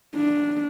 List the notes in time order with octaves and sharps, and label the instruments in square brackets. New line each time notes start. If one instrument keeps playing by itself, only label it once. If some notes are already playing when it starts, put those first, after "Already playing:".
[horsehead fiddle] D4